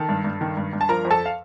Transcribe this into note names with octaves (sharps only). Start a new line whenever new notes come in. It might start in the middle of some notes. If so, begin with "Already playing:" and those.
Already playing: D#3 A4 A5
G2
G2
D#3
G2
G2
A5
F3 A#4 A#5
F2
A4 A5
F5